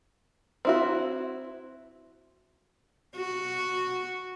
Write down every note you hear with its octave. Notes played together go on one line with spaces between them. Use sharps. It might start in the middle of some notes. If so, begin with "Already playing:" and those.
C4 E4 F#4
F#4